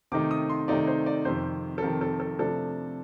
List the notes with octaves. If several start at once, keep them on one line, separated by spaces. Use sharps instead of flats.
C3 D#3 A3 D#4 D6
D#6
C6
C3 D#3 A3 D#4 D5
C5
D5
F2 C3 D#3 C5
A4
F2 C3 D#3 A#4
A4
A4
C3 F3 A3 D4 A4